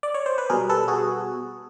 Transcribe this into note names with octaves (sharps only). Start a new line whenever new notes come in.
D5
C#5
C5
B4
B2 G3 G#4 A#4
A4 B4
F#4 G#4